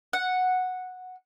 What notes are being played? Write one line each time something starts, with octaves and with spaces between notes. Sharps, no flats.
F#5